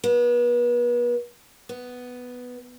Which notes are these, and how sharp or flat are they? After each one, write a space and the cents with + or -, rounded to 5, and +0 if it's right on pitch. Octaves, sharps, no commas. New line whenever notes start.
B3 -35
B3 +5